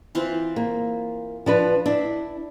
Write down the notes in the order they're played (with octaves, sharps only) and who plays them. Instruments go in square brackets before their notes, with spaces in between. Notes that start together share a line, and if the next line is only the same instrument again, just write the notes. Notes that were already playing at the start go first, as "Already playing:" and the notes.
[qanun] E3 C4 F4
[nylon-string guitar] A#3
F3 D4 B4
[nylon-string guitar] D4 [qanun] E4